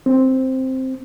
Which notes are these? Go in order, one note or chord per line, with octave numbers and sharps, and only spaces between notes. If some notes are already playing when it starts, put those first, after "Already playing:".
C4